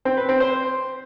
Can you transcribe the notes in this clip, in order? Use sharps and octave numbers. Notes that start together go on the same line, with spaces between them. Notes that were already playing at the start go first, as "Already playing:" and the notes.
C4
B4
C4
C5